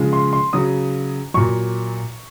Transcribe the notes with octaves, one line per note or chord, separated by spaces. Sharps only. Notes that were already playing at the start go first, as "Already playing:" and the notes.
Already playing: C#3 F3 G#3
C6
C6
C#3 F#3 D#6
A#2 F#3 C#6